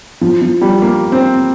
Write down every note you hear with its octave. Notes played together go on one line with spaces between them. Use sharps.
F3
F3
G3
A#3
C4